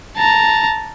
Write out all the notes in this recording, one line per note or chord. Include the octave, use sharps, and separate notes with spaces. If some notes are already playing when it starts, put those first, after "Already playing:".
A5 A#5